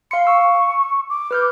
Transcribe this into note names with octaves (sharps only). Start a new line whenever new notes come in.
F5 C6 C#7
C#6 E6
D6
B4 F6 G6